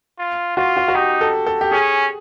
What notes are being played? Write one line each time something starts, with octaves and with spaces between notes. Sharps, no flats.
F4
F4 F#4
F#4
F#4
D#4 G4
A4
A4
G4
C#4 G#4